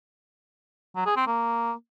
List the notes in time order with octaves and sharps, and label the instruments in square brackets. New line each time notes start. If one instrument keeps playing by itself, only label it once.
[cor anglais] F#3
G#4
C4
A#3